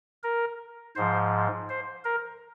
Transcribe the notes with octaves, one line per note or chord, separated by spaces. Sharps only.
A#4
G#2 F3 C5
C5
A#4